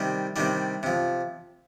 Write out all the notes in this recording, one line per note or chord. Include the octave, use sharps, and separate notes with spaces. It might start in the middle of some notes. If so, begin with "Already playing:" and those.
Already playing: C3 D#3 G3
C3 D#3 G3 D4
C3 F3